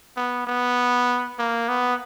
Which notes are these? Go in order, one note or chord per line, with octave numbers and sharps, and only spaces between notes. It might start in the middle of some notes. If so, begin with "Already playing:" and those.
B3
B3
A#3
B3